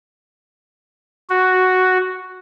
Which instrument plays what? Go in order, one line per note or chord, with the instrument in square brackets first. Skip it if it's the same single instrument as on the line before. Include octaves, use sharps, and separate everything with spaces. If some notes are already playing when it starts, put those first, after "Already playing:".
[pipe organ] F#4